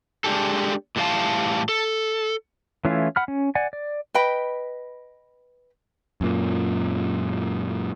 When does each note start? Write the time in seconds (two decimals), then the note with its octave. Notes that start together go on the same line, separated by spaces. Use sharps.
0.24 G#3 D4 G4 A4
0.96 A2 E3 G3 D4 F5 A5
1.69 A4
2.85 E3 A3 C#4 E4 F4
3.16 F#5 B5 F6
3.28 C#4
3.55 D5 F#5 G#5
3.73 D5
4.14 B4 D#5 G5 B5
6.21 F#2 A#2